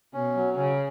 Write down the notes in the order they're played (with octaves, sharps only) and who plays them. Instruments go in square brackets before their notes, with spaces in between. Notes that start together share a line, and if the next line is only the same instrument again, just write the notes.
[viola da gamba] B2 [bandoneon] C#4
[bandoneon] F#3
[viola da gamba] C#3 [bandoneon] C#4